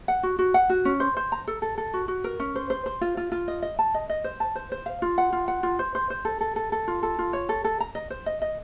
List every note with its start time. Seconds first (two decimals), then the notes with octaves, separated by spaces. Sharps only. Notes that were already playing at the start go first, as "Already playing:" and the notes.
0.08 F#5
0.23 F#4
0.39 F#4
0.54 F#5
0.70 F#4
0.85 C#4
1.00 C5
1.17 C5
1.32 A#5
1.47 A4
1.62 A4
1.78 A4
1.94 F#4
2.08 F#4
2.24 A#4
2.40 C#4
2.56 C5
2.70 C5
2.86 C5
3.01 F4
3.17 F4
3.32 F4
3.48 D#5
3.62 D#5
3.79 A5
3.94 D#5
4.09 D#5
4.24 C5
4.40 A5
4.55 C5
4.72 C5
4.86 F5
5.02 F4
5.18 F#5
5.33 F4
5.48 F#5
5.63 F4
5.79 C5
5.95 C5
6.10 C5
6.25 A4
6.41 A4
6.56 A4
6.72 A4
6.88 F4
7.03 A4
7.19 F4
7.33 C#5
7.49 A4
7.64 A4
7.80 A#5
7.95 D#5
8.10 C5
8.26 D#5
8.42 D#5